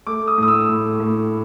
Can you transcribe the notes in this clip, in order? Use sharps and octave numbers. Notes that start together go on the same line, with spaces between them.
A3 D6
D#6
A2 D#6
E6
A2
A2